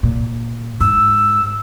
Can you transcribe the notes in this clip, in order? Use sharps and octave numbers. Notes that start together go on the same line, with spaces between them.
A#2
G#2 E6